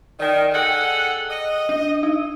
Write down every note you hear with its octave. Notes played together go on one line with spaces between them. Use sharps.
D#3 D5 G5
G#4 A4 F#5 G5
D#5
D4
D#4